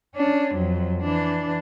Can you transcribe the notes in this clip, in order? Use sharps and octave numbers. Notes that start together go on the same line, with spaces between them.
C#4 D4
F2 F#3
E3 D4